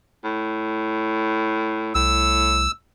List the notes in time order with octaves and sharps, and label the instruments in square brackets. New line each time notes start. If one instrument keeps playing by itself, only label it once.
[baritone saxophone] A2
[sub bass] C2 [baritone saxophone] A2 [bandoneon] E6